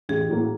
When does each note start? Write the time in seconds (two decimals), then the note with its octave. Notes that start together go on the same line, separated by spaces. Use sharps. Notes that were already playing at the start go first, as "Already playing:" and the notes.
0.09 A1 G#4
0.29 A2 F#3 A#3